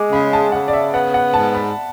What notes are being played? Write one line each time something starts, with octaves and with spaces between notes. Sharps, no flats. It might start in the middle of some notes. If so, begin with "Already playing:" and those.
Already playing: G#3 D6
C#3 B5
A5
C#3 F#5
D5
E5
B3 F#5
F#5
G#2 A5
B5